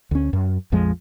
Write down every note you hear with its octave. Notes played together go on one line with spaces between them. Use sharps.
D2 C#4
F#2
A#1 F2 F3 G#3